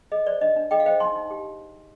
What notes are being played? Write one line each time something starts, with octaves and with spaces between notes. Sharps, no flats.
G#4 D#5
C5 D5
D4 D#5
D4
G#4 D#5 G5
F5
C5 D#5 G5
D#4 G#5 C6
D#4
G4